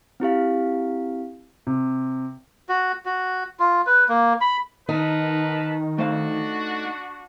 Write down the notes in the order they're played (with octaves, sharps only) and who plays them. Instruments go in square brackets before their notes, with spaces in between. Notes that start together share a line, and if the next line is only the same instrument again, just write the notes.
[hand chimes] C4 E4 G4 F5
[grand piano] C3
[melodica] F#4
F#4
F4
B4
A#3
B5
[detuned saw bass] D#3 [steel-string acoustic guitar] D#4 [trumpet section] A#4 B4 A5
[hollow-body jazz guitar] A3 C5 F5 [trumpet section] D4 F#4